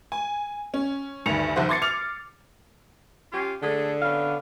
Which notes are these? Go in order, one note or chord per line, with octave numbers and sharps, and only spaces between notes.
G#5
C#4
D2 G2 D#3 C#7 F7
F#1 F2 D#3 C5 F#5
C6 D6 G#6 A6 C7 C#7
D6 F6 F7
C#4 F4 G4
D3 A3 G#4
B3 C#4 F5